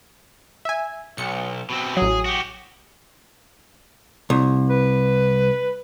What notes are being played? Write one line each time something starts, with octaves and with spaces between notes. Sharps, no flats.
E5 G#5
B1 C#7
B2 C4
A1 F#3 G#4
F#4 G4
C2
B4